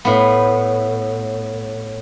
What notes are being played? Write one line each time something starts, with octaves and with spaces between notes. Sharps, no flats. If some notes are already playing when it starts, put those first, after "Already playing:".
A2 B3